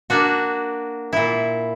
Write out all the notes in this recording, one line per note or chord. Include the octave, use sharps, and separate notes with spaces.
A#3 D4 F#4
A#2 E4